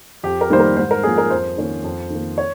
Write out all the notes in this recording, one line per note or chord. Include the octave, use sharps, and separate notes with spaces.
F2 G4
A#4
D#3 G3 A#3 D#4 C5
A#4
G#2 C5
A#4
F3 A#3 C#4 G#4
A#4
F2 C5
D#3 A#3 C#4
F2
D#3 A#3
C#5